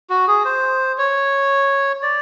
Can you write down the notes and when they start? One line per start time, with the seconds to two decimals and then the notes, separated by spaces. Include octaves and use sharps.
0.10 F#4
0.27 G#4
0.45 C5
0.98 C#5
2.03 D5